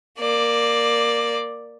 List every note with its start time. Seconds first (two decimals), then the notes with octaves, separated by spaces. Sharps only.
0.18 A#3 D5